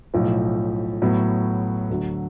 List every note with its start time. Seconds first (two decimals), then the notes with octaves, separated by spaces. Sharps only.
0.14 B1 A2 F3
1.02 A2 F#3 B3
1.90 D2 D3 F#3